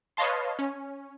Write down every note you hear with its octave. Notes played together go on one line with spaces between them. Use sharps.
B4 C#5 D#5 F5 A5 C6
C#4